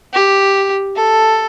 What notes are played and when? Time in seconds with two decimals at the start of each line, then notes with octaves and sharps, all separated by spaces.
0.13 G4
0.96 A4